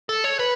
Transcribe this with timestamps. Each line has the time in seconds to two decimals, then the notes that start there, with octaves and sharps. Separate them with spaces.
0.09 A4
0.24 C#5
0.39 B4